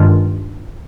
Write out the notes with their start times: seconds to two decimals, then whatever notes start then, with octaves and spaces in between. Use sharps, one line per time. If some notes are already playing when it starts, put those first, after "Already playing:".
Already playing: G2 D#3 G#3 D4 F4